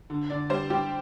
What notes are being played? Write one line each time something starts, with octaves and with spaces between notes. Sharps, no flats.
D3
D3 D5
G3 C5
G3 G4